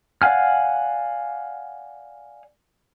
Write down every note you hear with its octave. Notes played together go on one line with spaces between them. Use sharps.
D5 F5 F#5 G#5 F6